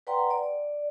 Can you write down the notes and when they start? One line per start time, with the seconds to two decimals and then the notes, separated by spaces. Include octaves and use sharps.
0.07 B4 D5 F#5 G5 A#5 C6
0.31 D5